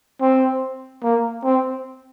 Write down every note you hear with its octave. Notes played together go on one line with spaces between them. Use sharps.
C4
A#3
C4